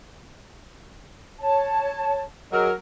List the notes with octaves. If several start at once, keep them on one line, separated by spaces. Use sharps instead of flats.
C#5 A5
F#3 G#4 A#4 D#5